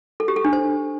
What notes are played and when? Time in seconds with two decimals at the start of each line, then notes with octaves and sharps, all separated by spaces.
0.20 A4
0.28 G4
0.36 A4
0.45 D4
0.53 C5